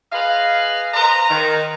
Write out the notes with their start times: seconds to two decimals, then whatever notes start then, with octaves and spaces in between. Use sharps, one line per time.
0.12 G#4 B4 D#5 F5
0.94 B4 C5 D#5 A#5
1.30 D#3